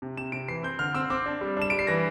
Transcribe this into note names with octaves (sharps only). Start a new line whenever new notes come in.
C3
C3 E7
C3 D7
E3 C7
C4 G6
D3 F6
C4 E6
C4 D6
D4
G3
D4 E7
G3 D7
C7
E3 A#6